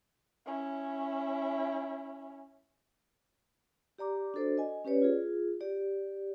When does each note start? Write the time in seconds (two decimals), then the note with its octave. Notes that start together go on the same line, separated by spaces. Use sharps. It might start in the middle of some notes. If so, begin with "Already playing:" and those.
0.46 C#4 E4
3.98 G4 D5 A#5 D6
4.34 D4 F#4 A4 C5 D5
4.58 D#5 G#5
4.85 C#4 G4 B4 C#5 D5
5.02 F4 G#4
5.61 G4 D5